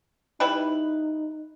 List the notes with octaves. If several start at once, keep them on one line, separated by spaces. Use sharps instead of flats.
G3 D#4 E4 B4